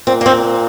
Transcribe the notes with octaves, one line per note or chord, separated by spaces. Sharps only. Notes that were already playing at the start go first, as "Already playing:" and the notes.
A#2 C4
A#3
C4